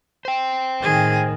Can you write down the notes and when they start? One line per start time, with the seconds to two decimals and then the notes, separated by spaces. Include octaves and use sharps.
0.25 C5 G5
0.83 A2 D#3 G#4